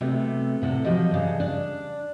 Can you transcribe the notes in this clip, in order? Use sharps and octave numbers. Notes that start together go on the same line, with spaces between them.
C3 F#3 A3 B3
A2 C3 A4 F#5
F3 F#3 G4 D#5
G2 C#3
D4